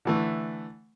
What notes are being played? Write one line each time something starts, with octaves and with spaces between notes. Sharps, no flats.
D3 E3 A3